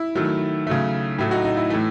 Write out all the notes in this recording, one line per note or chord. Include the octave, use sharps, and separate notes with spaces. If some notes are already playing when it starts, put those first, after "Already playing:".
Already playing: E4
D#3 F#3 A3
C#3 F#3 A3
A2 F#3 A3
D#4 F#4
D#4
E4
A2 E3 A3